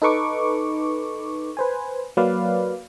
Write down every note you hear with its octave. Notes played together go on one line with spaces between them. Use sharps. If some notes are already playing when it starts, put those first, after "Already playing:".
D#4 A4 B4 C#6 D6
B4 C5 G#5
F#3 A#3 B4 D5 F5